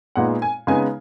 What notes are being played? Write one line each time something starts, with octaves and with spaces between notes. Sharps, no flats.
A#2 G#3 B3 D#4 F#5
G#5
C#3 G#3 B3 D#4 G#5